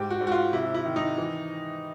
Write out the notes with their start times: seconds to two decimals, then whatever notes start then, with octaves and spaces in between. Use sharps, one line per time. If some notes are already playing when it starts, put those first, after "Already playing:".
Already playing: G#2 G4
0.10 F#4
0.21 G#2
0.27 F#4
0.32 F4
0.53 C3 E4
0.74 E4
0.86 D#3
0.96 D#4
1.18 E3